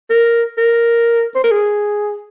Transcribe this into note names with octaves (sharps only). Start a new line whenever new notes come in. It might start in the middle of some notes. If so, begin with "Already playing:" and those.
A#4
A#4
C5
A#4
G#4